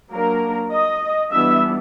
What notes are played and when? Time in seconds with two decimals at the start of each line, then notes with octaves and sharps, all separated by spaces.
0.11 F#3 A#3 D4 A#4
0.71 D#5
1.31 E3 G3 B3 D4 E5